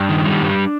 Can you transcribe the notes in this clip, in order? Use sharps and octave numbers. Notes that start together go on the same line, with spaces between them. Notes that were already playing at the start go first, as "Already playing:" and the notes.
Already playing: G2 D4
D#3
G3
G2